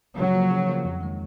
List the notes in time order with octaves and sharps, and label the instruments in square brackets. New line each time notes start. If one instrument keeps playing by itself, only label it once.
[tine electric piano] C#3 [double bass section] F#3
[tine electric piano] F3 A#3
C#3
F3 A#3
F2
D#3 G#3